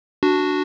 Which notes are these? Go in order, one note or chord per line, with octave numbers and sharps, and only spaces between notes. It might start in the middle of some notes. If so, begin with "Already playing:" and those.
D4 F#4